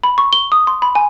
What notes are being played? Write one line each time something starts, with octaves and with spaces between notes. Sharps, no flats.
B5
C#6
G7
D#6
C6
B5
G#5